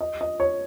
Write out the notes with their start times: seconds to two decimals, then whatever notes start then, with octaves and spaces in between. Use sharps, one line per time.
0.01 D#5
0.21 D#5
0.40 C#5